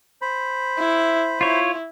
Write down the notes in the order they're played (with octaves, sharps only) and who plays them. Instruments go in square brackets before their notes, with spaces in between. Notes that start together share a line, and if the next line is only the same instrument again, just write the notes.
[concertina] C5 B5
[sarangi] E4
[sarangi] E4 [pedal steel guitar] F4 C#5